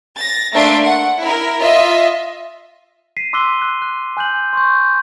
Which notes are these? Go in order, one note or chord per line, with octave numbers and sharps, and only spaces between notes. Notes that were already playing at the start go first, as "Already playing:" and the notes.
A6 A#6
A3 A#3 D4 E5 C6 D7
F#5
E4 A#4
F4 D#5 E5
B6 C7 D#7
C6 D6 E6 F#6 B6 G7
F#6
F#6
G#5 F#6 G6 F#7
C6 C#6 G6